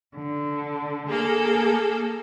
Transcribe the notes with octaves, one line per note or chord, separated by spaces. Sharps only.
D3
A#3 G#4 A4